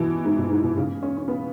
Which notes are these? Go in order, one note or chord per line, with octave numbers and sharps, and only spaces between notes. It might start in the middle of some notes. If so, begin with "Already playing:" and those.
Already playing: B2 E3
G#2
B2
G#2
B2
C#3
C#4
C#4
B3